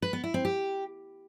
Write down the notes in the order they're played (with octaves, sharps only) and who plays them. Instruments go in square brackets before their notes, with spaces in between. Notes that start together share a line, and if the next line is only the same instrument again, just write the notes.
[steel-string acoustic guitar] B4
B3
E4
C4
G4